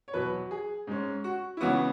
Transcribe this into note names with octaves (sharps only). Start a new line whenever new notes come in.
C#5
E2 B2 F#3 B4
G#4
G#2 G#3 C#4
F#4
E4
C#2 C#3 E3 B3 F#4